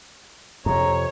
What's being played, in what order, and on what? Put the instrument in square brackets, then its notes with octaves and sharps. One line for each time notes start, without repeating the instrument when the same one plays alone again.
[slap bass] F2 C3 [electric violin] C#5 [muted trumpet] A#5